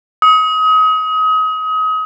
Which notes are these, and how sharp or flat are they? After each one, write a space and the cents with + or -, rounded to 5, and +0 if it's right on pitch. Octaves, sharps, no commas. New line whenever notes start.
D#6 +30